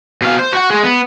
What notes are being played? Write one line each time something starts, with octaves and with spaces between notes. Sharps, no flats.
B2 F5
C5
F#4 F#5
G#3
B3